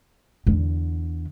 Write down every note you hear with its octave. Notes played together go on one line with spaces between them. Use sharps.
E2 D3